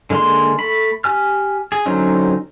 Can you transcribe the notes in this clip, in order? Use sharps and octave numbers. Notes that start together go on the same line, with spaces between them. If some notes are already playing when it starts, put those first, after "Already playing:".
D3 G#3 A#3 D4 C6
A3 B5
G4 G#5 F6
G#4
D3 F#3 C4 C#4 D#4